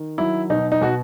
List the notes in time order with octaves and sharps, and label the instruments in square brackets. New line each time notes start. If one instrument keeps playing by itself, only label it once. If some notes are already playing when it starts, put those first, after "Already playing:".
Already playing: [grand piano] D#3
F#3 E4
B2 D#4
D#4
B2 F#4